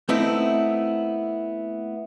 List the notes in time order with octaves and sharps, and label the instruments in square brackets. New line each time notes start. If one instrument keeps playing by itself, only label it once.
[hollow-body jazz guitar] A3 B3 C4 D#4 E4